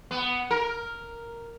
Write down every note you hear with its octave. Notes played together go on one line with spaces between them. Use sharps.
B3
A#4